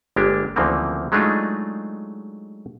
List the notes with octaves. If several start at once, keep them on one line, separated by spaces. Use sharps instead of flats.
G1 G#3 A#3 D4 G4
D2 C#3 E3 F3 A#3 C4
F#3 G#3 A3 D4 D#4 F4